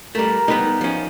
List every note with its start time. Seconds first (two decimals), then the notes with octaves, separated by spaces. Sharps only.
0.15 G3 A3 A#4
0.48 G3 B3 D#4 B4
0.81 F3 C#4